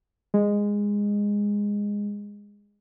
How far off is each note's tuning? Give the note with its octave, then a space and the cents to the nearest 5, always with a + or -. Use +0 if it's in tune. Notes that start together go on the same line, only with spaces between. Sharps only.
G#3 -15